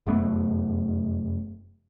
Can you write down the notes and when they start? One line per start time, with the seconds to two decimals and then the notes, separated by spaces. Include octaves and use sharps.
0.07 F1 F#2 A3 B3